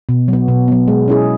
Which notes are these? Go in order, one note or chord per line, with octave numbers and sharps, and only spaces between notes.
B2
F#3 B3
B2
F#3 B3
G#3
C#4 E4 G#4